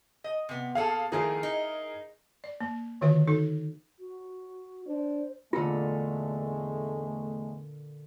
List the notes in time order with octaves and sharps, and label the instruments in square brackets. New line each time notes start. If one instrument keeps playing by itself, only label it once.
[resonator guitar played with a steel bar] D#5
C3 B3
[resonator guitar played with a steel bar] A#2 G#4 A4 [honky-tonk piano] F5
[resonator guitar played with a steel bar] D#3 F3 A3 [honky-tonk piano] E4 G#4 A#4
[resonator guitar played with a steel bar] D#4
[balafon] D5
A#3
D3 D#3 F4 F#4 B4 E5
D#4 F#4 A4
[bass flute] F#4
[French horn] D4 [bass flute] C5
[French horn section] E2 G#3 A3 [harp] A#2 D3 [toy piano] F4